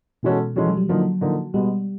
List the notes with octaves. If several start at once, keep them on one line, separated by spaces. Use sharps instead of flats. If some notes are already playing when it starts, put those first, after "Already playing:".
B2 E3 G#3 C#4 F#4 A4
E3 F3 G#3 C#4 F#4 A4
F#3
G3
D3 F3 F#3 A#3 D#4
D3 F3 A#3 D#4
B2 G3 G#3 B3